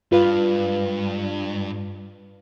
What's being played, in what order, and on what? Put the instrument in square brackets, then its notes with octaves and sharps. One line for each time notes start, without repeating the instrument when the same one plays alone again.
[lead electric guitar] G2 [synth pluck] F4 B4 F5